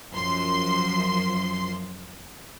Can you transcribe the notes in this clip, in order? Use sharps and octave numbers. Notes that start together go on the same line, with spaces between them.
F#2 F3 C6